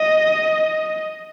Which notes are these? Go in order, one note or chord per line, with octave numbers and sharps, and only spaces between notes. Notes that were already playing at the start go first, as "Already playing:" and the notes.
Already playing: D#5